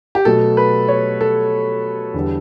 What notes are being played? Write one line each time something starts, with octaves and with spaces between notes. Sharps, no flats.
G4
B2 F#3 A3 A4
B4
C#5
A4
E2 D3 G3